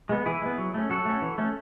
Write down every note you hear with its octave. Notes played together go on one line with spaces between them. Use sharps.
G#3 B3
E3 E4 G#4
G#3
B3
F#3
A3 C#4
F#3 F#4 A4
A3 C#4
E3
A3 C#4